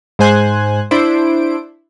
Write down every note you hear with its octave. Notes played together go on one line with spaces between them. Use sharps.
G#2 G#3 C5 G#5 F#6
D4 E4 C5 D7